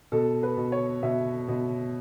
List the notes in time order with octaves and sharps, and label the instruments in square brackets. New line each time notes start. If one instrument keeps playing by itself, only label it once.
[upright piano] B2 A4
B4
B2
C#5
B2 E5
B2